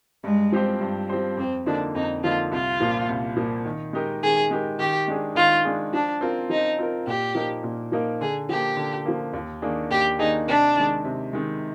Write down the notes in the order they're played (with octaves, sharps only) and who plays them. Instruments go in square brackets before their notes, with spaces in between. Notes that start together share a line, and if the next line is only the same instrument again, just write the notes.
[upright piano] G2 [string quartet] G#3
[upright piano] F3 C4 G4 C5
G2
F3 C4 G4 C5
[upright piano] F2 [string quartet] C4
[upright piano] D3 F3 A#3 D#4 [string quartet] D4
[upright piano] F2 [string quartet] D#4
[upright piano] D3 F3 A#3 D#4 [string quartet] F4
[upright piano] C2 [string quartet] F4
[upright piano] A#2 F3 A#3
C2
A#2 F3 A#3
D#3
G#3 D#4 G4 A#4
[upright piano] D#3 [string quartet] G#4
[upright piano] G#3 D#4 G4 A#4
[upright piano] D#3 [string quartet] G4
[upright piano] G#3 D4 G#4
[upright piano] D#3 [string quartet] F4
[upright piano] G#3 D4 G#4
[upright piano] F3 [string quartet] D4
[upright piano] C4 F4 A#4
[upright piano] F3 [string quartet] D#4
[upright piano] C4 F4 A#4
[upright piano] A#2 [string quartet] G4
[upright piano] F3 A#3 D#4 A#4
A#2
F3 A#3 D#4 A#4
[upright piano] D3 [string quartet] G#4
[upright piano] F3 A#3 [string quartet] G4
[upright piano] D3
F3 A#3
D#2
D#3 A#3 D4 G#4
[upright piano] D#2 [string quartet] G4
[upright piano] D#3 A#3 D4 G#4 [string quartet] D#4
[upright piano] C3 [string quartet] D4
[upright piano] D#3 G#3
C3
D#3 G#3